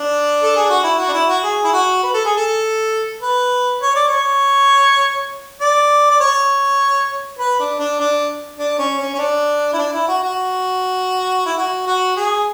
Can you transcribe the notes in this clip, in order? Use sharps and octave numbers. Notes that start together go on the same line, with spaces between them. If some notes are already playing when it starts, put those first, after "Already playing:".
Already playing: D4
A4
G#4
F#4
E4
F#4
D4
E4
F#4
G#4
E4
F#4
B4
A4
G#4
A4
B4
C#5
D5
C#5
D5
D5
C#5
B4
D4
D4
D4
D4
C#4
C#4
C#4
D4
E4
D4
E4
F#4
F#4
E4
F#4
F#4
G#4